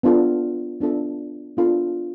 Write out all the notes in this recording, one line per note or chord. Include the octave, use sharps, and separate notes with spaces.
B3 D4 F4 A4
B3 D4 F4 A4
B3 D4 F4 A4